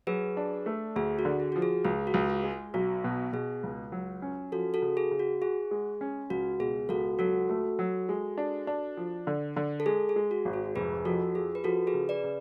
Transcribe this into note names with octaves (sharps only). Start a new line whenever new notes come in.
F#3 G#4 B4
D4
A3
D2 G#4
F#4
D3
G#4
F3 F#4
G#4
C#2 G#4
F#4
C#2
G#4
G#3
B1 F#4
B2
B2 G#4
C#2
F#3
C#4
F3 F#4 A4
F#4 A4
C#3
G#4
C#3
F#4
F#4 G#4
G#3
C#4
C#2 F#4
B2 G#4
C#2 F#4 A4
F#3 F#4 A4
A3
F#3
G#3
D4
D4
F3
D3
D3
A4
G#3 G#4
G#4
G#3
F#4
G#1
G#4
F1 G#4 B4
F2 F#4 A4
F3 G#4
B4
F3 F#4 A4
G#4 B4
C#3
B4 D5
C#3